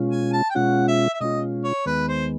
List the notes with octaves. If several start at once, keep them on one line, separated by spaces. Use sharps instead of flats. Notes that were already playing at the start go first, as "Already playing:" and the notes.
Already playing: B2 G#3 C#4 F4
G#5
A5
G5
B2 G#3 C#4 F4 F#5
E5
E5
B2 G#3 C#4 F4 D#5
C#5
D#2 D#3 G#3 B3 B4
C5